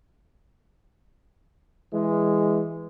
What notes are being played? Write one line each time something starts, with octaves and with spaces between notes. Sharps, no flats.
E3 G#3